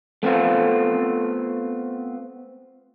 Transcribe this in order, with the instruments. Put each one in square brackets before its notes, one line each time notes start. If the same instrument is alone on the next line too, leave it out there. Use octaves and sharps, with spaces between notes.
[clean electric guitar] A3 B3 C4 F4